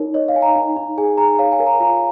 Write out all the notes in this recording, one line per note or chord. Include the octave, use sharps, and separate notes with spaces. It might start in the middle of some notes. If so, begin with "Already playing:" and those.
Already playing: D#4 A#4 C#5
C#5 D#5
F5
D#4 G#5
A#5
D#4
D#4
G#4 G#5
G#4 A#5
C#5 F5
G#5
A#4
A#5
F4 A#5